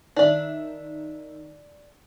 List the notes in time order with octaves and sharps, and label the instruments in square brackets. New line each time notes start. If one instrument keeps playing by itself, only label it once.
[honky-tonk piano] D#3 E5 [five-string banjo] D4 D5